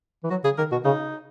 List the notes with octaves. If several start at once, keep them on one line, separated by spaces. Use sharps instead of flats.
E3
F#3 F#4
C#3 G#4
D#3 A#4
B2 F#4
C#3 D#4